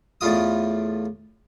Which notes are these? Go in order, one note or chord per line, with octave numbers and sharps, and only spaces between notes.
E2 A2 A3 F4 D#6